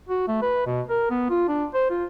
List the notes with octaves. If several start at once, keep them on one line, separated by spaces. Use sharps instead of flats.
F#4
A3
B4
B2
A#4
B3
F4
D4
C5
F4